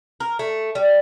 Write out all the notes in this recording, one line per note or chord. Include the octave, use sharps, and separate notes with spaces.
A#4
A3
G3